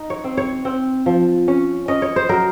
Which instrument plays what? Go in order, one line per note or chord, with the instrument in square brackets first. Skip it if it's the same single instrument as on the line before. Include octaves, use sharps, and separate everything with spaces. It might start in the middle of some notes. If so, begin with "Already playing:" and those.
Already playing: [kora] D#4
C#5
C4
C#5
C4
F3
C#4
C#4 D#5
C#5
C5
F#3 A#4